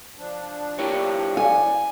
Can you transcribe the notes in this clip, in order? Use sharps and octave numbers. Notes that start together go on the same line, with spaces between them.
F3 D4
E4 G4 A#4 C#5
D5 G#5